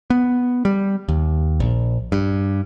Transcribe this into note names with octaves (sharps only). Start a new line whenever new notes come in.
B3
G3
D#2
A#1
G2